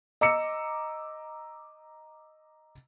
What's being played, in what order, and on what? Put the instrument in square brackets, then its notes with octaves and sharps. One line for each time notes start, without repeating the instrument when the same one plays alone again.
[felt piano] D#5 A#5 D6 E6 C#7